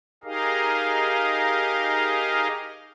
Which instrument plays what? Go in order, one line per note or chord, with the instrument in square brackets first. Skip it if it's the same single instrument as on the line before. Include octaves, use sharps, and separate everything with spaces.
[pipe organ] D#4 G4 G#4 A#4 D#5 F5